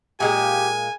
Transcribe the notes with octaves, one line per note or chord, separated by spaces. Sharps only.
A#2 G#3 A#3 G4 G#5